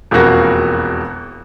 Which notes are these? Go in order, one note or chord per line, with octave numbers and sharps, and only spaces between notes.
E1 F2 A#3 F#4 A#6